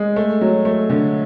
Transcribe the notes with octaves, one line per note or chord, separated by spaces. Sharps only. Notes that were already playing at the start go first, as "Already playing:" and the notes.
Already playing: G#3
A3
F#3
A3
D3